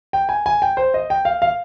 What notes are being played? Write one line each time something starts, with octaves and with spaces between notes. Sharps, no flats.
G5
G#5
G#5
G5
C5
D#5
G5
F5
F5